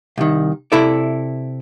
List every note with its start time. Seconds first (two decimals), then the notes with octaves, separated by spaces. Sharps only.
0.18 C2 D#3
0.72 C3 E4 A4 D5